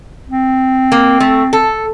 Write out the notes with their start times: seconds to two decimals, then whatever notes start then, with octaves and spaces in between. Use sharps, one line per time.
0.29 C4
0.92 A#3
1.20 A3
1.53 A4